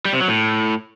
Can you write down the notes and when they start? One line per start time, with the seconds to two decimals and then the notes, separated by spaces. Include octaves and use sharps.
0.05 G3
0.13 C3
0.21 F#3
0.28 A2